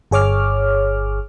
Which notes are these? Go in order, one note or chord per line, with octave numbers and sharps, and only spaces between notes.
G1 G#4 C#5 D6 F6